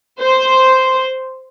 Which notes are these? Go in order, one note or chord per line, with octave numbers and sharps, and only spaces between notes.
C5